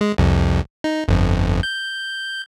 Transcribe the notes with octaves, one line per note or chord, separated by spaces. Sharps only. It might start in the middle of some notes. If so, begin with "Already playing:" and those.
G#3
C2 F2
D#4
G1 F2
G6